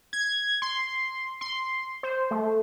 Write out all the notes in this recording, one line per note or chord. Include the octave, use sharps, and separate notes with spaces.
G#6
C6
C6
C5
A3